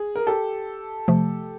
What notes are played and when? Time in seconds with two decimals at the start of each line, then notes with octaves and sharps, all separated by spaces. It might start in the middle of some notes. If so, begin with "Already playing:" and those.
Already playing: G#4
0.16 A#4
0.27 G4 A4
1.08 C3 F3 A3